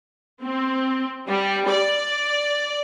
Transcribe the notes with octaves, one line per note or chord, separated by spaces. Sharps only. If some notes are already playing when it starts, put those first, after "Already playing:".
C4
G3
D5